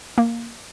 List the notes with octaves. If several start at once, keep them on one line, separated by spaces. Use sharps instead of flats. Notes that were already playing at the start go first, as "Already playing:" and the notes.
A#3